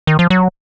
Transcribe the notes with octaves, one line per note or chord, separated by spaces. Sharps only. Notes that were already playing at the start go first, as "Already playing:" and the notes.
D#3
F3
F#3